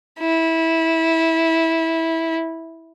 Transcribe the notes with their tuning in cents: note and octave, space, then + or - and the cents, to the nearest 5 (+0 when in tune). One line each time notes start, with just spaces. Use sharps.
E4 -15